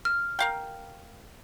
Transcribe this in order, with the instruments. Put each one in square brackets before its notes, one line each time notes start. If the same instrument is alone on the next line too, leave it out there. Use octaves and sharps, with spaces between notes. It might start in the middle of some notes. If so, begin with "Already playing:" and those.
[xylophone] F6
[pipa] A#4 F5 G5